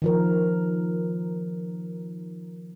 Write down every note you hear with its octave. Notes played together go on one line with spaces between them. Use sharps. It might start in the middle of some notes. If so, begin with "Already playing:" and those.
D#3 F3 A#4